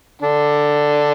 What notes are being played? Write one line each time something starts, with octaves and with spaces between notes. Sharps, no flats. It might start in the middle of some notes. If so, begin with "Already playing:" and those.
D3 D4